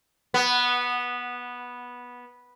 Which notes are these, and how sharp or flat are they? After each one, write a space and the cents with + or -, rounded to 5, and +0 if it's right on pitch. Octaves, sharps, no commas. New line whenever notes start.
B3 -10